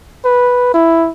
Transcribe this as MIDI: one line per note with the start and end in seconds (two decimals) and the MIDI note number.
0.25 0.69 71
0.74 1.10 64